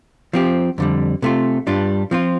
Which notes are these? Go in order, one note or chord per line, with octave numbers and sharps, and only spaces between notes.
F3 C4 G4
F2 D3 G3
C3 A3 F4
G2 G3 D4 F4
F3 C4 F4